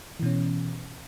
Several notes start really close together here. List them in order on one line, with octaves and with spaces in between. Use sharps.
E3 B2 C#4